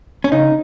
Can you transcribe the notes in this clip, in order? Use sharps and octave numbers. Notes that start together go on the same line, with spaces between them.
C#4
C#3 D#4